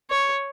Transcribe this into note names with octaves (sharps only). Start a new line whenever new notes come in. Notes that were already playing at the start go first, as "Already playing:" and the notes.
C#5